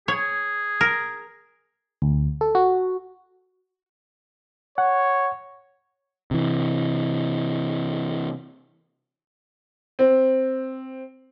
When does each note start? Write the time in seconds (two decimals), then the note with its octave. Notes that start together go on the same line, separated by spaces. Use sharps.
0.08 G#4 C#5
0.81 A#4
2.02 D2
2.41 A4
2.55 F#4
4.78 C#5 F#5
6.31 C3 E3
9.99 C4